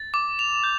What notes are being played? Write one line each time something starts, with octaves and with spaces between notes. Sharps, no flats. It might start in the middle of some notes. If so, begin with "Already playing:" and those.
Already playing: A6
D6
F7
G6